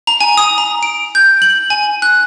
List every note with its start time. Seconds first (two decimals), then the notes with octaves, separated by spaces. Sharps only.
0.07 A#5
0.21 G#5
0.37 D#6
0.58 A#5
0.83 D7
1.15 G6
1.42 F#7
1.70 G#5
2.02 F#6